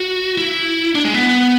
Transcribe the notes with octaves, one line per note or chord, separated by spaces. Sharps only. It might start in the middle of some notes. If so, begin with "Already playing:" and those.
Already playing: F#4
E4
D4
G#3
B3